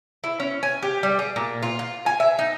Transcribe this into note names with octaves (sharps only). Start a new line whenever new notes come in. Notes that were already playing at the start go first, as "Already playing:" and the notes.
E4
C#4
G#5
G4
G3
G#4
A#2
F4
F4
G#5
E5
D#4